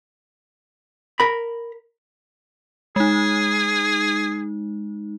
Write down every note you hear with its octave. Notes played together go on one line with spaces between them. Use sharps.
A#4 B5
G#3 D#4 G#4